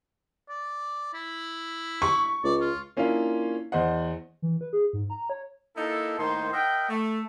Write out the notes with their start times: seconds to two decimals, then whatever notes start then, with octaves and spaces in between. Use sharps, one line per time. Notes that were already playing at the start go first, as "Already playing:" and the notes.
0.49 D5
1.14 E4
2.02 C#6
2.44 C#2 D5
2.61 F4
2.97 A#3 C#4 D4 E4 F4 F5
3.72 E2 C5 D#5 F#5
4.42 E3
4.61 B4
4.73 G#4
4.93 G#2
5.10 A#5
5.30 C#5
5.77 A#3 D#4 E4 A4
6.18 A2 D#3 A#3 D#4 C5 C6
6.53 A#4 D#5 E5 F#5 G5
6.89 A3